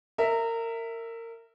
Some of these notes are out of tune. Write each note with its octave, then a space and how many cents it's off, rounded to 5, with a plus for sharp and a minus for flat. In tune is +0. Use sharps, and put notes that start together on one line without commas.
A#4 -25 E5 +0